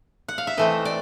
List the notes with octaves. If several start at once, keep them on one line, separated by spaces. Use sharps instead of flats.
F#5
F5
E5
E3 A3 C4 D#5
D5